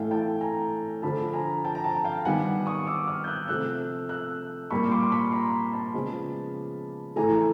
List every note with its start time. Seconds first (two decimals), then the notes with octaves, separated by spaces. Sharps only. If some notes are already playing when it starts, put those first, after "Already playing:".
Already playing: A2 E3 A3 F5 G5
0.11 G5 A5
0.41 G#5 A#5
1.02 D3 F3 A3 A5 B5
1.33 G#5 A#5
1.65 G5 A5
1.75 A#5
1.84 G5 A5
2.04 F5 G5
2.25 D#3 G3 B3 F#5 G#5
2.66 C#6 D#6
2.87 D6 E6
3.07 D#6 F6
3.24 G6
3.27 E6 F#6
3.48 C3 F3 A3 E6 F#6
4.09 E6 F#6
4.70 A#2 G3 A#3 B5 C#6
4.92 C6 D6
5.11 B5 C#6
5.32 A#5 C6
5.73 A5 B5
5.94 C#3 F3 G#3 B3
7.16 A2 E3 A3 G#5 A#5